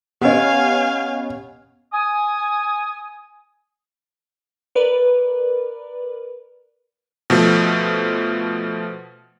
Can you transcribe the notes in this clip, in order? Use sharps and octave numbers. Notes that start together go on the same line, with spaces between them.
B3 C#4 G4 D#5 F5 G#5
G#5 D#6
A#4 B4 D5
B2 F3 A3